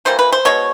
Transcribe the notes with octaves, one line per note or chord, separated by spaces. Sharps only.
E3 G3 A#3 C5
B4
C5
B2 G#3 C#5